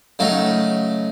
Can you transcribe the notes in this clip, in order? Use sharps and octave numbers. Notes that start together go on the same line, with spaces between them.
C#3 F#3 A3 D#4